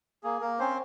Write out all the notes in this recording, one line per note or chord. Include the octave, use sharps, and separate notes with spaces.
A#3 G#4
A#3 A#4
C4 C#4 C5